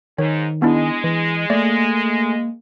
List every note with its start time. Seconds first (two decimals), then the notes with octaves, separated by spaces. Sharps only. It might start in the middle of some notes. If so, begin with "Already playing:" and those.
0.18 G#2 D#3 C#5
0.62 G#3 B3 D4 E4
1.04 E3
1.50 A3 A#3 D5